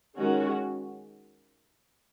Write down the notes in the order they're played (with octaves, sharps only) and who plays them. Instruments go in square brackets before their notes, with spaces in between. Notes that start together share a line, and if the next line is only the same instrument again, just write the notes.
[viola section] D#3 G#3 C#4 F#4